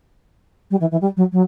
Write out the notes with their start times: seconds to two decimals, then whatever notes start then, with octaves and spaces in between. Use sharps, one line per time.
0.70 G3
0.80 E3
0.91 E3
1.01 G3
1.16 F#3
1.32 F#3